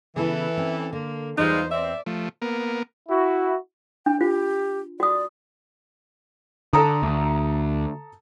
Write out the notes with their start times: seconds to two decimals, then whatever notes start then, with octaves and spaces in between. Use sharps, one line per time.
0.16 C#3 E3 B3 E4 A4
0.57 C4 C#4
0.93 D3 A#3
1.38 E2 G3 G#3 D#4 F4 C5 D#5
1.71 C4 D5 E5
2.06 F3 A3
2.42 A#3 B3 A#4
3.09 E4 F#4
4.06 D4 G5
4.21 F4 G4
5.00 F#4 D5 D#6
6.73 D3 A4 A#5 D#6
7.03 D2